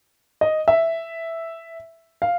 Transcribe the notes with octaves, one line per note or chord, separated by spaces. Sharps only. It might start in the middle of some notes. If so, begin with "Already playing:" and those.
D#5
E5
F5